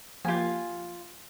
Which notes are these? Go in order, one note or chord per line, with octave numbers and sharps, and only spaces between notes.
F3 A#3 F4 G4 G#5